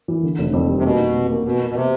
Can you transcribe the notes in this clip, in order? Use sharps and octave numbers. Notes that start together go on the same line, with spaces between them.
E3
D3
F1
F2
G3
C3
B2 A#3
D#4
C3
A#3
B2 B3
B3
B2
C3 B3